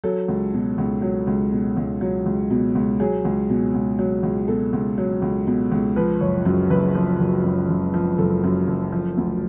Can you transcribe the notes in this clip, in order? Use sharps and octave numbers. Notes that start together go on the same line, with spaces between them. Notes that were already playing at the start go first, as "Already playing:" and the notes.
F#3 A4
C#2
B2
C#2
F#3
C#2
B2
C#2
F#3
C#2
B2
C#2
F#3 G#4
C#2
B2
C#2
F#3
C#2
B2 A4
C#2
F#3
C#2
B2
C#2
F3 B4
F#1 C#5
F#2
F#1 B4
F3
F#1
F#2
F#1
F3
F#1 A4
F#2
F#1
F3
D2